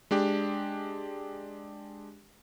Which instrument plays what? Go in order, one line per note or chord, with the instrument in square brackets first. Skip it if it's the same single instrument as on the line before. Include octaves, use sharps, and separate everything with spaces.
[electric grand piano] G#3 D4 G4